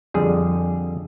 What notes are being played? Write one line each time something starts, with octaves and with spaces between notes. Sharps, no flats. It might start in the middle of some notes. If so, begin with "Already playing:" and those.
F2 D3 G3 G#4